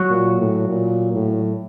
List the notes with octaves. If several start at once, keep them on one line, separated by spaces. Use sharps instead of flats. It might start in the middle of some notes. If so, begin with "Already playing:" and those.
Already playing: F#3 F#4
A#2
A2
A#2
A2